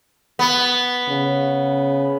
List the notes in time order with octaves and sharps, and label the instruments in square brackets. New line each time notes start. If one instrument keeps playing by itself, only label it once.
[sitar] B3
[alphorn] C#3